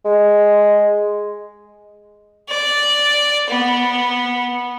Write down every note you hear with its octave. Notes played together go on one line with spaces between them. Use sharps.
G#3
D5
B3